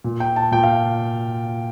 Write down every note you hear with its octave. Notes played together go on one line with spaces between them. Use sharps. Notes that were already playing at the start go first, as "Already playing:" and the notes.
A#2
G5
A5
A#2 G5
F5